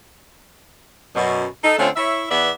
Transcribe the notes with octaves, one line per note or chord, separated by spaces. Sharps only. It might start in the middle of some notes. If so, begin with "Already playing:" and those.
F#2 B2
D#4 A4
D3 A3 C4 C#4 F4
E4 C#5 E5
E2 B3 B4 D5 E5